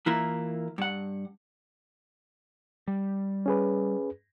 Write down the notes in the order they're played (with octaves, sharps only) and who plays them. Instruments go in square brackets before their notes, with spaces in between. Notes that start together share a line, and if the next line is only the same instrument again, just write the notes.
[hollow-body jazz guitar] E3 A#3 E4 F4 A#4
G2 F#5
[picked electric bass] G3
[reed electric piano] C#4 G#4 B4